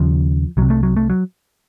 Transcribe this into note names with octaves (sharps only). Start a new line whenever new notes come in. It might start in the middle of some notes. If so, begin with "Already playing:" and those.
Already playing: D#2 C#3 F3
C2 C3 F#3
A3
F#3
A3
F#3